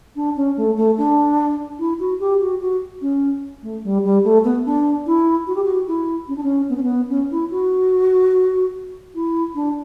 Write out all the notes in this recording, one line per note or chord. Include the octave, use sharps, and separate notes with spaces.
D4
C#4
A3
A3
D4
E4
F#4
G4
F#4
F#4
C#4
A3
G3
G3
A3
B3
D4
E4
F#4
G4
F#4
E4
C#4
D4
C#4
B3
C#4
B3
C#4
E4
F#4
E4
D4